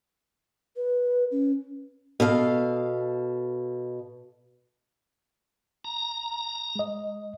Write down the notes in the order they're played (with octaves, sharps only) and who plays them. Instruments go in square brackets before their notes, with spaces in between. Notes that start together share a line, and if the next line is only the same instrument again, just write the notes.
[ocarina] B4
C#4
[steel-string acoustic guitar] B2 A4 F5
[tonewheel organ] A#5
[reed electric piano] G#3 D#5